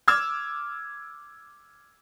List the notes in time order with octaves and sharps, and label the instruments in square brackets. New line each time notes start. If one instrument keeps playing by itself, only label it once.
[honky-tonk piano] D6 E6 F6 G#6